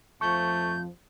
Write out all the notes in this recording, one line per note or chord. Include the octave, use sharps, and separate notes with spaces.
F2 F3 A3 C#6 G6